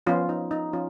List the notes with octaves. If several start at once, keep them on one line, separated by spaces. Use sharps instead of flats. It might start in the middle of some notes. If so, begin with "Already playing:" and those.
F3 B3 C#4 F4
D#4
D#4
F3 C#4 F4